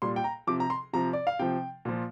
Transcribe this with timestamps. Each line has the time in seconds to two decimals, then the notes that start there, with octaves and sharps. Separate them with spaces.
0.02 A#2 G3 C6
0.16 G5
0.24 A#5
0.47 C3 F3 D6
0.60 A#5
0.70 C6
0.93 C3 F3 A#5
1.13 D5
1.27 F5
1.39 C3 F3 G5
1.85 A#2 F3